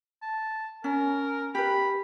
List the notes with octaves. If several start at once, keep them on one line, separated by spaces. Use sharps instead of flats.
A5
C#4 A#4
G4 B4 B5